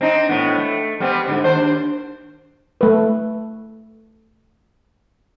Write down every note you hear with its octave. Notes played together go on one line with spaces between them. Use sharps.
C4 D4 D#4
A2 B3
A3
G3 B3 C4
G#2 D3
D#2 D4 C5
A3 B4